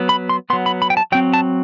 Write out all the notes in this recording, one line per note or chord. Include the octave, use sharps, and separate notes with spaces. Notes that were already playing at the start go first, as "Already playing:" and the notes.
Already playing: F#3 B3
B5
C6
F#3 B3 C6
B5
B5
G5
A5
F#3 C4 G5
A5